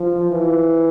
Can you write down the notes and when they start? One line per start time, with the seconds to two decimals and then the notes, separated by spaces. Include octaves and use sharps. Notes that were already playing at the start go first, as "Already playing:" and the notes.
Already playing: F3
0.31 E3